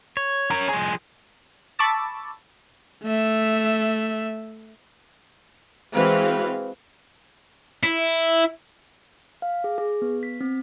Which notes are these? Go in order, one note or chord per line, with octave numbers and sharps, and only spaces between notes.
C#5
C#4 A#4
F3 G#4
A5 B5 C#6 D6 E6 A6
A3 E5
E3 G#3 C4 F#4 B4 F5
E4
F5
G#4
G#4
B3
B6
C4